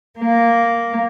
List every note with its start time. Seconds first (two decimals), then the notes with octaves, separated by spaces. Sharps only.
0.19 A#3